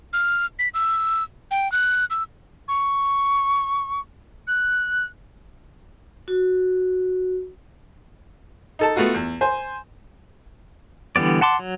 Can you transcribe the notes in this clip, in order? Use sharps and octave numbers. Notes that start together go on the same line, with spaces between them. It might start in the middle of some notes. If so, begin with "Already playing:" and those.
F6
B6
E6
G5
F#6
E6
C#6
F#6
F#4
D#4 A4 A5
A3 B3 F4 F#4
E2
C5 G#5
D3 E3 G3 B3 D5
F#5 A5 C6 D6
F#3